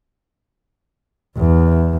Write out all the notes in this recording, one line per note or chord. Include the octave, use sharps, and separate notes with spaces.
E2